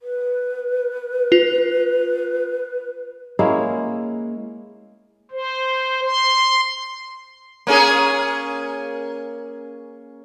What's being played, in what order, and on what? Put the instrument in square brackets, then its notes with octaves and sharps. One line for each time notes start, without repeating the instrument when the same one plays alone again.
[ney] B4
[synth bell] F4
[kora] G#3 A#3 C#4 E4
[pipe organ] C5
C6
[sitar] A#3 C#4 G#4